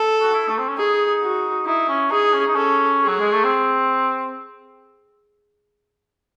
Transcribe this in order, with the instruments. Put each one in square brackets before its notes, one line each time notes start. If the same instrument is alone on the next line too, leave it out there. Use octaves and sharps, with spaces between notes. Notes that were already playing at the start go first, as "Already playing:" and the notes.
Already playing: [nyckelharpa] A4
[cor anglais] F#4
E4
A3
C4
C#4
[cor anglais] D#4 [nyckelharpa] G#4
[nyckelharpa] F#4
[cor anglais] D#4 [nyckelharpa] E4
[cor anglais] C#4
[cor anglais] D#4 [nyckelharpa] G#4
[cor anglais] C#4
D#4
[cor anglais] C#4 [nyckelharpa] A4
[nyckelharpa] G#4
[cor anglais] F#3
G#3
A3
C4